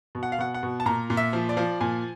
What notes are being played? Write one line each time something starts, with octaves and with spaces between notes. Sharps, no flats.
B2
F#5
F5
B2 F#5
F#5
B2
A5
A#2 A#5
A#2
E5
F3
D5
F3
A#2 G#5